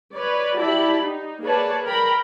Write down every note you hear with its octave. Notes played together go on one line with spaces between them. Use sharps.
B4 C#5 D5
E4 F#4 G4 D5 A5 B5
D#4
A#3 G#4 B4 C#5 D5 A5
A#4 G5 A#5 B5